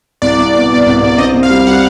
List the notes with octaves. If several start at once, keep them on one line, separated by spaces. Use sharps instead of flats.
C2 D5
C2
B2
B2
C2
C2
C4 D#5
C3
F5
G3
G3 F#5